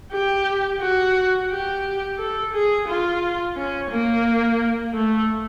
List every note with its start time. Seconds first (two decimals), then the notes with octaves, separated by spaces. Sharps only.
0.13 G4
0.81 F#4
1.51 G4
2.18 A4
2.54 G#4
2.88 F4
3.57 C#4
3.91 A#3
4.94 A3